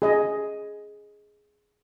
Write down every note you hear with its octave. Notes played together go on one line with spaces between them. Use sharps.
G#4 D#5